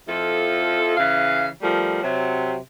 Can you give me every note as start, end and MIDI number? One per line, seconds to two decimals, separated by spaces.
0.08 0.96 41
0.08 0.96 53
0.08 0.96 64
0.08 0.96 69
0.97 1.48 49
0.97 1.48 52
0.97 1.48 77
1.61 2.01 53
1.61 2.01 55
1.61 2.01 57
1.61 2.01 70
2.03 2.57 48
2.03 2.57 54